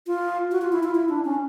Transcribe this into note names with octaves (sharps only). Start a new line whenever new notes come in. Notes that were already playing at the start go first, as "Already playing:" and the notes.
F4
F#4
F4
E4
F4
E4
D4
C#4